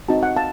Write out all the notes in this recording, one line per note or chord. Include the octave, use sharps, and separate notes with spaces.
C4 D#4 F#4 A5
F#5
F5 A5